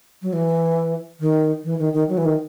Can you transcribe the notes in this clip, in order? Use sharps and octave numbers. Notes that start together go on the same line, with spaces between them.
F#3
E3
D#3
E3
D#3
D#3
F#3
E3
D#3